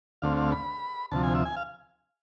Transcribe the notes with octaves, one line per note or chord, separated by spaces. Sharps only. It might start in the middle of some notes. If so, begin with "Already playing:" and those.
D2 D3 A3 C4 F5
F5
B5
D2 C3 F3 A5
G#5
E5
G#5
F5